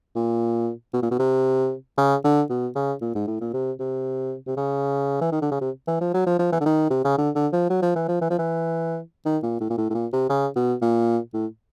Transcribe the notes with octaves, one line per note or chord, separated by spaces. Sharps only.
A#2
B2
A#2
B2
C3
C#3
D3
B2
C#3
A#2
G#2
A2
A#2
C3
C3
C3
C#3
E3
D#3
D3
C#3
C3
E3
F3
F#3
F3
F3
E3
D3
D#3
C3
C#3
D3
D3
F3
F#3
F3
E3
F3
E3
F3
E3
D#3
A#2
A2
A#2
A2
A2
A#2
C3
C#3
B2
A#2
A2